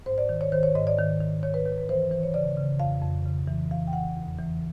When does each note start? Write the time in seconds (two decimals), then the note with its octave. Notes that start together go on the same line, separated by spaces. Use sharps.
0.06 G#2 C5
0.18 D5
0.29 D#3
0.41 C#5
0.52 D#3 C5
0.63 C#5
0.75 G#2 D#5
0.87 D5
0.98 D#3
1.21 D#3
1.43 D#3 C#5
1.54 B4
1.65 D#3 B4
1.78 B4
1.89 E3 C5
2.11 E3 C5
2.23 C#5
2.34 C#3 D5
2.57 C#3
2.80 F2 F5
3.02 F2
3.26 C#3
3.47 E3
3.71 E3 F5
3.87 G5
3.93 E3 F#5
4.17 E2
4.38 E3